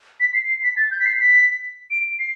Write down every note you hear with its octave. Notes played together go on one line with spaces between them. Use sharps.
B6
C7
C7
B6
A6
G6
B6
C7
B6
D7
C7